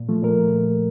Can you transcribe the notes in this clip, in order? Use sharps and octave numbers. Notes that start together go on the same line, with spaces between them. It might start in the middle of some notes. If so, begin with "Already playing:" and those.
Already playing: A#2
F3 A3
A#2 A#4